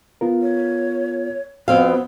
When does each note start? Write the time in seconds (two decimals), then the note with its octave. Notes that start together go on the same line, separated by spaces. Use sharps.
0.21 B3 F4 A#4
0.42 C#5
1.68 F2 B3 C4 F#4 F5